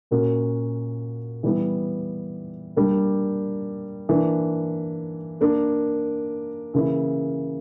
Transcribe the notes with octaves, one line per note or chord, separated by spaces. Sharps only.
A#2 A#3 C#4 F#4 A#4
E3 G3 B3 E4
G3 A#3 D4
E3 A#3 D4
A#3 D4 A#4
C#3 E3 A#3 E4